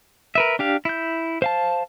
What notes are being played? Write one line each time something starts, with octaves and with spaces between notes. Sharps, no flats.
A#4 B4 E5
D4 G4 F5
E4 G6
C5 F5 A5